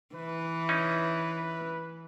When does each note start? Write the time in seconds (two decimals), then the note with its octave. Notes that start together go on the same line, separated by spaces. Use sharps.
0.15 E3 B4
0.69 C#4 D#4